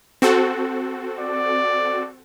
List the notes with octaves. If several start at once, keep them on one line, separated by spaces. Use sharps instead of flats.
C4 F#4 A4
D5